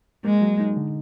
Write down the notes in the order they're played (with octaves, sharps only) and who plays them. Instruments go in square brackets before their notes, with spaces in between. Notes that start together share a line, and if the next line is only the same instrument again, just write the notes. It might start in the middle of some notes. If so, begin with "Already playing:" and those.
[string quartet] G#3 [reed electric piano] A#3
[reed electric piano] F#3
D#4
D3